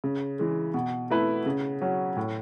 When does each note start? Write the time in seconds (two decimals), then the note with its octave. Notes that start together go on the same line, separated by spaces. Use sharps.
0.04 C#3
0.39 E3 G#3
0.74 B2
1.10 A3 E4 B4
1.46 C#3
1.81 F#3 C#4
2.17 A2